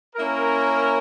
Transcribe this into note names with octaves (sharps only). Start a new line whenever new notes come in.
A#3 C#4 E4 A#4